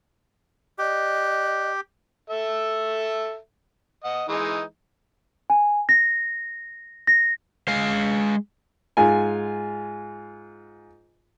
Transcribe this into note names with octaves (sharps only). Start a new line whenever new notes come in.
G4 D5 D#5 F#6
A4 E5
D#5 F#5
E3 G#3 D#4
G#5
A#6
A#6
G#3 F5
G#2 F4 G#5